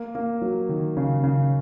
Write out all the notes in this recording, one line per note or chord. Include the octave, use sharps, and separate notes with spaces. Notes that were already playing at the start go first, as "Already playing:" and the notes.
Already playing: A#3
A#3
F#3
D#3
C#3
C#3